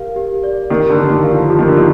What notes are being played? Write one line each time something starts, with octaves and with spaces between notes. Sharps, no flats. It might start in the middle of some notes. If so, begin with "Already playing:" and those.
Already playing: G4 A#4 F5
G4
D5
D#3 G4
D3
G4
D3
D#3
F5
F3
F3 G4
D#3
D3
D#3 G4